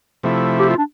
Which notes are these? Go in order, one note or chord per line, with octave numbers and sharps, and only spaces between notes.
C3 F3 A3 E4
G4
F4
D4